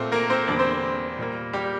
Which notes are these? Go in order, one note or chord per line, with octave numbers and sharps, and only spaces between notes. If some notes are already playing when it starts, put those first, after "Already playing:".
Already playing: A#2 A3 C4 C5
A#3 A#4
C4 C5
E2 D3 G3 A#3 D4 D5
C4 C5
A#2 G3 A#3
G3 G4